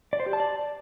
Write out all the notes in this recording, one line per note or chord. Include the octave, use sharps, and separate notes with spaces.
D5
C5
G4
A5
D5